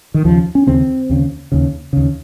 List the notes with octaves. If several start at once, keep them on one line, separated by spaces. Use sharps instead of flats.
D#3
D#2 C#3 F3
C#4
D#2 C#3 C4
D#2 C#3
D#2 C#3
D#2 C#3